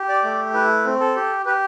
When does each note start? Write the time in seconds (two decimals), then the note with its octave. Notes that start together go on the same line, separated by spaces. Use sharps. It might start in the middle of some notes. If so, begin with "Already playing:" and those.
Already playing: G4
0.09 D5
0.24 A3
0.54 E4 B4
0.85 C4
1.00 A4
1.16 G4
1.46 G4 B4